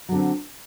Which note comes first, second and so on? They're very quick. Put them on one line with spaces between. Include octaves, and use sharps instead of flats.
F#3 D3 C4